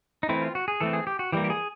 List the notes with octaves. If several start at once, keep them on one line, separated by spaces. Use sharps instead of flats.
D#4
E3 A3 C4 E4
F4
F#4
G#4
E3 A3 C4 A4
G#4
G4
F#4
E3 G3 A#3 G4
G4
G#4